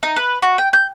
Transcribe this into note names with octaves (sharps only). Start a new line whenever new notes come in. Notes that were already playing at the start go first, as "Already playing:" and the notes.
D#4
B4
F#4
G5
G6